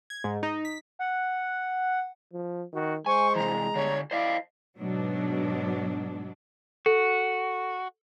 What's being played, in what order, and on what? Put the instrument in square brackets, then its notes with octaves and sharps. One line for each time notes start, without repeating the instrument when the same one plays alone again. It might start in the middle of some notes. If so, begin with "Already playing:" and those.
[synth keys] G#6
G#2
D#4
B6
[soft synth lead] F#5
[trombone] F3
[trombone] D#3 [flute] F#4
[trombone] G#3 [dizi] C5 [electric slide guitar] G#5 [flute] C#6
[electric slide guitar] C3 E3 [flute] A#5
[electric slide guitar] D3 D4 G4 [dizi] C#5
[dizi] E4 [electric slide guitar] C5 D#5 F5 [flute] D5
[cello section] G#2 B2 F#3 D4
[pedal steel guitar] F#4 [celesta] A4